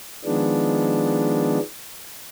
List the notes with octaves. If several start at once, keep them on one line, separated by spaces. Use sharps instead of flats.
D#3 F3 G#3 B3 D4